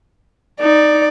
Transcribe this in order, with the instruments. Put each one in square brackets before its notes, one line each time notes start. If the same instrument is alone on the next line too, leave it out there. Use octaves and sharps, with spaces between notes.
[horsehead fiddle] D#4 [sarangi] D5